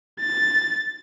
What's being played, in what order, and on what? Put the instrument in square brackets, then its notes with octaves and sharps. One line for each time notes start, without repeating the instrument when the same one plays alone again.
[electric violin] A6